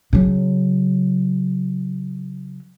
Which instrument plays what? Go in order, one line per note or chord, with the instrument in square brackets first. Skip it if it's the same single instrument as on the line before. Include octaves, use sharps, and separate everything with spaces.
[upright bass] C#3 F#3